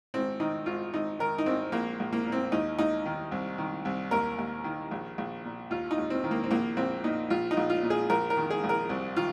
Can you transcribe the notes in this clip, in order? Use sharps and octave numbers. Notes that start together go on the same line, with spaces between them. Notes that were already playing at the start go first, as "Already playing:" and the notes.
G#1 C4
D#3 D#4
G#1 F4
G#1 D#4
D#3 A#4
D#4
G#1 C4
A#1 A#3
A#1
A#3
A#2
C4
D#2 D#4
D#2 D#4
D#3
C2
D#3
C2
D#2 A#4
D#2
D#3
A#1
A#1
A#2
D#2 F4
D#4
D#2
C4
D#3
A#3
C4
A#1 A#3
A#1 C4
A#2 D#4
A#1 F4
D#4
A#1
F4
A#2
G#4
A#1 A#4
A#4
D#3
G#4
A#1
A#4
C2
D#3 F4